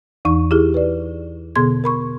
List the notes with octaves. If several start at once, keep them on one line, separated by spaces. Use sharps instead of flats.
E2 E3 D#4 C#6
E4 G4 G#4
B4 D5
B2 D3 B3 G#4 C6 G#6
A#4 B5 C#6